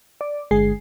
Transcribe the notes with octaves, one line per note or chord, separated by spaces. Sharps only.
D5
G1 D3 G#3 G#4 C7